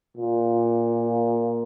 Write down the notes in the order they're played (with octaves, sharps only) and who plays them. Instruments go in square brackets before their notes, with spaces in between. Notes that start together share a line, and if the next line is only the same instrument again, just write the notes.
[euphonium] A#2